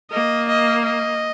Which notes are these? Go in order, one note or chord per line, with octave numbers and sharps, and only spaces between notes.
A#3 D#5
D#5
D#5